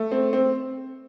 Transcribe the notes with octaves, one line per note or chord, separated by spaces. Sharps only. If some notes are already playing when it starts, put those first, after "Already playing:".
Already playing: A3
C4
C4